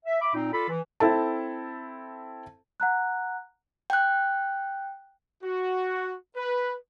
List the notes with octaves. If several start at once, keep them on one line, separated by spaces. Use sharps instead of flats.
E5
E5 B5 D6
A#2 C4 D#4
F4 A4 D5 B5
E3
C4 E4 A4 A5
F#5 A#5 F#6
G5 F#6
F#4
B4